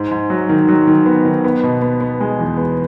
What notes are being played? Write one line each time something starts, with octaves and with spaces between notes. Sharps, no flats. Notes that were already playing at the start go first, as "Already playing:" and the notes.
Already playing: G#2
G#2
F#3
D#3
F#3
D#3
B3
D#3
B3
B2
B3
B3
G#3
E2
B3